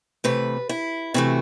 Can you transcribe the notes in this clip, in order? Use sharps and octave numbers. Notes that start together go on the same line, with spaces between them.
C3 E3 A3 B4
E4
C3 E3 A3 F#4